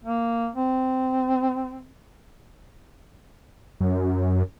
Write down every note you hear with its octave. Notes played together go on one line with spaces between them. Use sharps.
A#3
C4
F#2